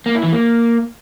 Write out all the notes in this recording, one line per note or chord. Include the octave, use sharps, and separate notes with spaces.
A#3
E4
E3
A#3